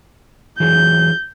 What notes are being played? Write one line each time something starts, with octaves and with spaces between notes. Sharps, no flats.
E3 F#3 G#4 G6